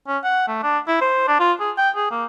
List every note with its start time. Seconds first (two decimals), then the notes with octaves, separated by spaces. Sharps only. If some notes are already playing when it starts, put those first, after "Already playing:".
0.07 C#4
0.24 F#5
0.47 A3
0.63 D4
0.88 E4
1.01 C5
1.28 D4
1.40 F4
1.60 G#4
1.77 G5
1.96 G#4
2.11 A#3